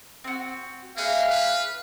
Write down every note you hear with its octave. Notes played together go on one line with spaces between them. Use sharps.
C4 F#4
A#3 E4 G#4 F5 F#5
B4